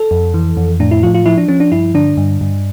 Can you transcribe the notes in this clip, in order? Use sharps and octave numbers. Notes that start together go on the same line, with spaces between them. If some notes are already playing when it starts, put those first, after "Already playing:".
Already playing: A4
F2
E3
F2
A2 D4
E4
F3 F4
F4
F3 E4
D4
F3 C#4
D4
G2 E4
D3 D4
G2
G2